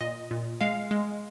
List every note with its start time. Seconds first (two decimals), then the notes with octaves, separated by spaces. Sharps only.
0.01 A#2 D#5
0.31 A#2
0.61 G#3 F5
0.91 G#3